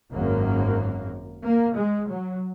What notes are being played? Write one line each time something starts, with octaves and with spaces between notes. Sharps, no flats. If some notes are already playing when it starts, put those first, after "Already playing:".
G#1 F#2 A#3
A#3
G#3
F#3